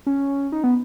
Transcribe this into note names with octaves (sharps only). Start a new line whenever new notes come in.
C#4
D#4
B3